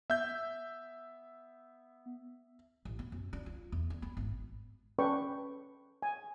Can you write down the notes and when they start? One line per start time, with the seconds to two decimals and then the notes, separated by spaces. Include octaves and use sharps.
0.10 B3 E5 G6
2.85 A1
2.99 B3
3.12 F#2
3.33 D4
3.46 F4
3.72 E2
3.90 D4
4.02 B3
4.17 G#1
4.98 C#4 A4 B4 D5 G5 C#6
6.02 G#5